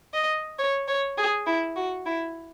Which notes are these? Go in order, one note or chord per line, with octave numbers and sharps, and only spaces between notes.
D#5
C#5
C#5
G#4
E4
F#4
E4